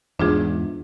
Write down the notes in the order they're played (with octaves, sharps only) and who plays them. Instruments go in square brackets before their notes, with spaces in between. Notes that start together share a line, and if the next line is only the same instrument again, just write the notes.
[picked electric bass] E2 G#2 [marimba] D4 F4 G#4